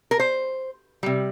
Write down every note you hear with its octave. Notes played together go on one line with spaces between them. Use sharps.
A#4
C5
C3 G3